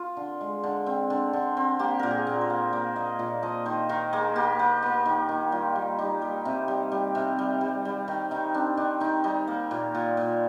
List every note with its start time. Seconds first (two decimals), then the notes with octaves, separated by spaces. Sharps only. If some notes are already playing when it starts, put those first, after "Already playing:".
Already playing: F4
0.17 D3
0.41 G#3
0.63 D3
0.86 C4
1.10 D3
1.33 D3
1.57 C4
1.79 A#3 G4
1.99 A#2 A#4
2.11 G#4
2.27 A#2
2.41 C5
2.50 A#3
2.73 A#3 D5
2.96 A#3 D#5
3.19 A#2 D5
3.43 F3 D#5
3.66 D#3 C5
3.89 D#3 A#4
4.13 A#3 G#4
4.35 A#3 G4
4.59 A#3
4.82 A#3
5.06 D#3
5.29 D#3
5.52 G3 F4
5.75 G3
5.98 G3 D#4
6.22 G3
6.45 C3
6.68 G3
6.92 G3
7.15 C3
7.39 G3
7.61 G3
7.85 G3
8.08 D#3
8.31 D#3 D#4
8.54 C4 D4
8.77 D#3 D4
9.00 D#3 D#4
9.24 G3 D#4
9.47 A#3
9.71 A#2
9.95 A#2
10.17 A#2